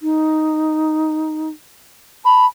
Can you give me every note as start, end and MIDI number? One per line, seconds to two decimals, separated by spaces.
0.01 1.49 63
2.25 2.45 81
2.25 2.46 83